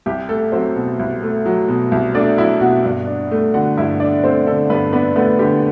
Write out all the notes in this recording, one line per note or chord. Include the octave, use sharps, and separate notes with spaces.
C2 G4
A3 A4
F#3 C4 C5
B2
C2
A3
F#3
B2
C2
A3 D4 D5
F#3 E4 E5
B2 F#4 F#5
G2
D4
A3
D3 F#4 F#5
G2 E4 E5
D4 D5
A3 C4 C5
D3 A4
G2 B3 B4
B3 D4 B4
A3 B3 B4
D3 G4